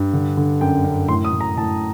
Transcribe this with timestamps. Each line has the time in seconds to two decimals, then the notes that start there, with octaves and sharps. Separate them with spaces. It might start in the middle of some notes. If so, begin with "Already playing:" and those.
Already playing: G2
0.13 D3
0.37 D3
0.61 F#2 G5
0.84 F#2
1.08 A2 C6
1.25 D#6
1.32 A2
1.40 A#5
1.57 A2 A5